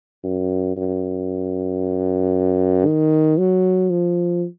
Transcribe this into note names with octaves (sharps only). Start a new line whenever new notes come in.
F#2
F#2
D#3
F#3
F3